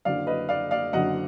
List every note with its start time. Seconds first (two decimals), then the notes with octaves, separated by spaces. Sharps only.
0.05 F#1 F#2 D3 D5 F5
0.27 B4 D#5
0.49 D5 F5
0.71 D5 F5
0.93 F#1 F#2 D3 D#5 F#5